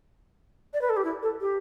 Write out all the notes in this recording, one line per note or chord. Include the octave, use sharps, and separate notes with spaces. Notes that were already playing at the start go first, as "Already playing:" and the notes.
D5
B4
A4
G4
E4
A4
G4